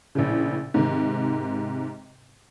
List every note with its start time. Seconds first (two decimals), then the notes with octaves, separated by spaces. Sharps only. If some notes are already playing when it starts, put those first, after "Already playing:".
0.15 A#1 A2 C#3
0.74 G#2 C3 D#3